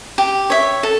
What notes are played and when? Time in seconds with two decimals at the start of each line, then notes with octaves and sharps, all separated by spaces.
0.18 G4
0.50 C#5 E5
0.83 A4